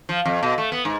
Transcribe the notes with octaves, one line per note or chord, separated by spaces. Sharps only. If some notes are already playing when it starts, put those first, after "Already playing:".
F3
F2
B2
A3
B3
G#2